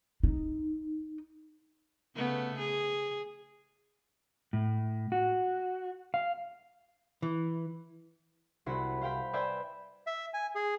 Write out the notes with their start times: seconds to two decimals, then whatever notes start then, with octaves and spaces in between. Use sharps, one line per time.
0.23 D#4
2.16 C#3 A3 B3
2.59 G#4
4.53 A2
5.12 F#4
6.14 F5
7.22 E3
8.66 C2 E4 F#4 C5 B5 C#7
9.01 C5 F5 G5 B5
9.33 B4 C5 D5 E5 G5 G#5
10.07 E5
10.34 G#5
10.55 G#4